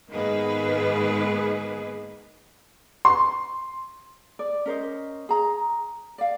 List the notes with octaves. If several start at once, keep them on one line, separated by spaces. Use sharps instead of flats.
G#2 D#3 A#3 B3 G#4 B4
C6
D5
C#4 A#4 C5 D#5
G#4 A#5
D5 F5